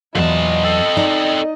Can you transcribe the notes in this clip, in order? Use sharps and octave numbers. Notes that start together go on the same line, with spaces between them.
E2 A#2 F#3 D#5 A5
C4 A4
D#4 D5 A#5